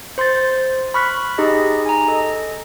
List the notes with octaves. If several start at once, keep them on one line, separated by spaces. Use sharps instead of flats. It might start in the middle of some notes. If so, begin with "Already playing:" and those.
C5 C6 G6 A6
B5 C#6 F6 F#6 B6
D#4 G4 G#4 D#5
G#5 A#5
A4 D#5